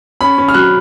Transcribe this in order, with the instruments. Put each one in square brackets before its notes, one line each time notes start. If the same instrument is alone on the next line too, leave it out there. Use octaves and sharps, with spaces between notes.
[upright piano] C#4 [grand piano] B5
[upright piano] C#4
[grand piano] F6
[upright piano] F#3 [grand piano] F#6